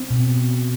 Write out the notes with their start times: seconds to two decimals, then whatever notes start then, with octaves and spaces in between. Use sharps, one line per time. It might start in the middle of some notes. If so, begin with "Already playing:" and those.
Already playing: C4
0.10 B2